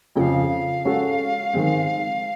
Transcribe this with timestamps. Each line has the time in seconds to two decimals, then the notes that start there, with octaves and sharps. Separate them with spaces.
0.16 F2 C#3 F3 F5 G5
0.85 G#3 C#4 F#4 A4
1.54 D#3 G#3 C4